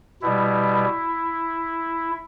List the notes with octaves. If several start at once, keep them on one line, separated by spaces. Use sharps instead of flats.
B2 G3 E4